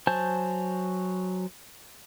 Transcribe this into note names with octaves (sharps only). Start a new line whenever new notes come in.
F#3 C5 G#5 A5 G6